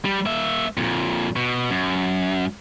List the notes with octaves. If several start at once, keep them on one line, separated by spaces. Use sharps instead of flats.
G3
A#3 E5
F2 A#2
B2
F#2